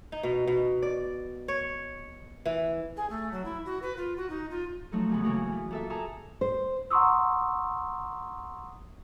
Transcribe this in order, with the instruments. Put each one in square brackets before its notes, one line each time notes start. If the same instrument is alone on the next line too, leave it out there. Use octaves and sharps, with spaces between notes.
[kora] D#4
B2
B2
D5
C#5
E3
[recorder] G#4
A3
F#3
E4
F#4
B4
F4
F#4
D#4
F4
[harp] F3 F#3 A3 D#4 A4
D#2 C#3 B3
A2 C#3 E3 F#3 A#3 F#4
E3 B3
A#2 A4 E5
G#4 A4 A5 A#5
[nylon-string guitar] C5
[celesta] F#5 A#5 C6 C#6 D#6 E6